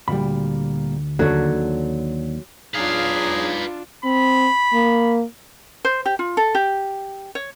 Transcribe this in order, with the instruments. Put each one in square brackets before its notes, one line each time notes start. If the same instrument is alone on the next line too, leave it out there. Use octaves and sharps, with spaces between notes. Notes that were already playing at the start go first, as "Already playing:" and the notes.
[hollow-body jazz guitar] D2 B5 [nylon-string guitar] A#2 G3
[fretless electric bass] D#2 D3 [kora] F#3 [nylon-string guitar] A4 C#5
[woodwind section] E2 F#3 D#4 [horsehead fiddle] D4 F4 [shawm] G#4 [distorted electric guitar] B4 F5
[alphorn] C4 [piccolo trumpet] B5
[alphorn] A#3
[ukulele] C5
G4
F4
A4
G4
C#5